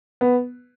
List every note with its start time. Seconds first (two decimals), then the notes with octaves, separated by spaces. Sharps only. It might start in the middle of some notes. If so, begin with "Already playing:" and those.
0.21 B3